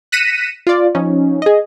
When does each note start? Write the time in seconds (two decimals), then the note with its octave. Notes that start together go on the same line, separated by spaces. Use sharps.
0.12 F#6 A#6 B6 C#7 D#7 E7
0.67 F4 D5
0.95 F3 C#4 D#4
1.42 G#4 D#5